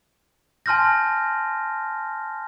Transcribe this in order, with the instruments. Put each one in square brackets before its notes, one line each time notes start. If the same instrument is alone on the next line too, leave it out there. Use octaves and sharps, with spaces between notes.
[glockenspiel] G#5 A5 C6 F6 G6 A#6